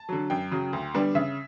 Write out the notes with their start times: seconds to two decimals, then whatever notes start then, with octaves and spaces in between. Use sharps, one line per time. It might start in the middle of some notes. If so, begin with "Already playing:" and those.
Already playing: A5
0.09 D3 F#3
0.30 F#2 G5
0.52 C#3 F#3
0.73 D2
0.94 D3 G3 B3 D4
1.15 C#3 E5